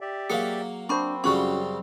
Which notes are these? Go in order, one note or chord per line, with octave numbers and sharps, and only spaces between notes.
G4 D5 E5
F#3 A#3 G#4 F5 C#7
C4 D4 C5 B5 C#6
F#2 C#3 G3 C#4 F4 F#4 C#6